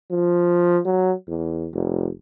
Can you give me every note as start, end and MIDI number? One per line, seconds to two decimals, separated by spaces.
0.11 0.80 53
0.85 1.13 54
1.28 1.68 40
1.73 2.10 29